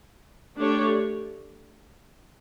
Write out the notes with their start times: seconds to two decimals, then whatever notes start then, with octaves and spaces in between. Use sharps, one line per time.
0.57 A3 D4 G4 C#5